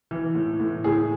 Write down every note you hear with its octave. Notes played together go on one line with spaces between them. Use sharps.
E3
A2
A2
A2 G#4